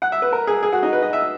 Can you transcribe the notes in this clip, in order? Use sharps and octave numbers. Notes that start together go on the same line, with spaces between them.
F#5
E5
B4
A#4
G#4
G#4
F#4
D#4
B4
D#5
E5